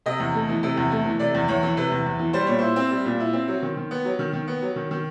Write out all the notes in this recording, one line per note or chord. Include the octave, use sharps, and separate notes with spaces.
C3 D#5
E2
A3
E3
C3
E2
A3
E3
C3 D5
E2
E2 C#5
E3
C3 B4
E2
E2
E3
G3 C5
A#2 C#5
E4 C5
C4
G3
A#2
E4
C4
F#3
D#3
D#3
B3
F#3
D#3
D#3
B3
F#3
D#3
D#3